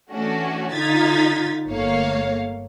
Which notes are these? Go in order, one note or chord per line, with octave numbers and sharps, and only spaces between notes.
E3 A3 C#4 D4 F#4
D3 D#4 F4 G#6 A6 B6
G1 A3 A#3 C#5 F5